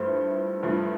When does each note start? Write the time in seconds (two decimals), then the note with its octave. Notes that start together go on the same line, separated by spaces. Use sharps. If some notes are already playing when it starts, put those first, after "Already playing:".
Already playing: G2 F3 A3 E4 C5
0.63 G2 F3 A3 E4